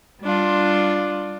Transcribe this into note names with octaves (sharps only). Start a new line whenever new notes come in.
G3 D4 F4